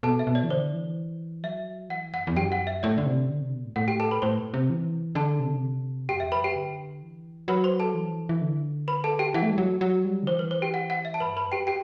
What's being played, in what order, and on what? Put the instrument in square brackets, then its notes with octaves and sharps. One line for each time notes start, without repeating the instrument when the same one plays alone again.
[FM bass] B2 [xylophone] A4 A5
[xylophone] E5
[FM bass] B2
[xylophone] D5
[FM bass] E3
[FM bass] D3 [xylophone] C5
[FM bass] E3
[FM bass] F#3 [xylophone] E5
[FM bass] E3 [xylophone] F#5
[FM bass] F#2 [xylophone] F#5
[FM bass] E2
[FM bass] F#2 [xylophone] G4 G5
[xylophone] F#5
E5
[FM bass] A2 [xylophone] D5
[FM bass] D3
C3
D3
C3
B2
A2
[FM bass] A2 [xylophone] F#5
[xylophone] G4 G5
A4 A5
B4 B5
[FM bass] A2 [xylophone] C5 C6
[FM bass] C3
E3
[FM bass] D3 [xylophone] A4 A5
[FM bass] C3
D3
C3
[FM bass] F#2 [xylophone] G4 G5
[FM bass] E2 [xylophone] E5
[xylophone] B4 B5
[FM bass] F#2
[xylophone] G4 G5
[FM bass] D3
E3
[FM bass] F#3 [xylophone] B4 B5
[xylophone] C5 C6
A4 A5
[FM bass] E3
E3
D3
[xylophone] B4 B5
A4 A5
G4 G5
[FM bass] E3 [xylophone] F#5
[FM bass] A3
G3
F#3
F#3
G3
D3
[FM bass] E3 [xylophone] C5
[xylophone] B4
C5
G4 G5
F#5
F#5
E5
A5
[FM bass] G2 [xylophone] B4 B5
[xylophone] B4 B5
[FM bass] F#2
[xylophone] G4 G5
G4 G5